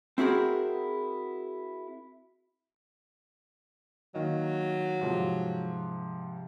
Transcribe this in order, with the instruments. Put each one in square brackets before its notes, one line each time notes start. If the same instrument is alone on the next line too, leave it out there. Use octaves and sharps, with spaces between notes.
[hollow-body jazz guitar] C4 E4 F#4 G#4 A#4
[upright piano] D#3 A#3 D#5 [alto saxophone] F#3
[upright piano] G#2 C3 F3